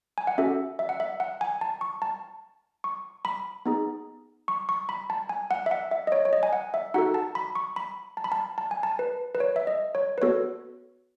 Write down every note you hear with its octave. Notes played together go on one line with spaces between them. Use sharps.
G#5
F#5
C#4 F#4 A4 E5
E5
F#5
E5
F#5
G#5
A5
C#6
A5
C#6
B5
B3 D#4 G#4
C#6
C#6
B5
A5
G#5
F#5
E5
F#5
E5
D#5
C#5
C#5
D#5
G#5
F#5
E5
D#4 F#4 A4 F#5
A5
B5
C#6
B5
A5
B5
A5
A5
G#5
A5
B4
B4
C#5
E5
D#5
C#5
B4
B3 F#4 A4 C#5